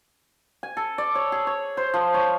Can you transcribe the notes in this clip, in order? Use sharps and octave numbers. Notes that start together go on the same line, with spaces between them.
G#5
A4
D5
C#5
G#4
C#5
C5
F3
C#5